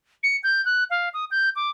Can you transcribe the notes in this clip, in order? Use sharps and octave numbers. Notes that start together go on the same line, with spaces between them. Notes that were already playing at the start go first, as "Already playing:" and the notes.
C#7
G6
F#6
F5
D#6
G6
D6